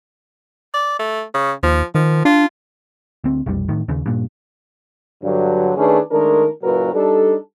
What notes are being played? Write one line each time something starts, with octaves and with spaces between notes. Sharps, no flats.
D5
A3
C#3
D#2 F3
D#3 F3
D4 F4
D2 C4
F1 B1 F2 G3
A2 D#3
D#2 C#3
G2 A#2
G2 D3 F#3
D#3 A3 C#4 D4 G#4 B4
D#3 G#3 A3 D4 A#4
F#1 A#2 F#3 F#4 A#4 B4
G3 D4 D#4 A4